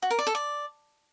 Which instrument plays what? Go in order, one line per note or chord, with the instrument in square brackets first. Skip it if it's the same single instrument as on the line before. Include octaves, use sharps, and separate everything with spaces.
[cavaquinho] F#4
A#4
D5
A4
D5